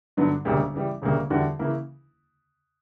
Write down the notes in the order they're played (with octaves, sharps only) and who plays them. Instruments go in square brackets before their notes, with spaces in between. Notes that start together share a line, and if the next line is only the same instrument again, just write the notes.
[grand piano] G2 D3 F#3 B3 D4
E1 D2 C#3 G3 A#3
C#3 E3 G3
E1 D2 C#3 G3 A#3
E2 D3 G3 B3 F#4
C#3 E3 A#3 E4